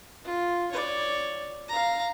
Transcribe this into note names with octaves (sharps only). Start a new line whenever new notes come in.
F4
C#5 D5
F5 A#5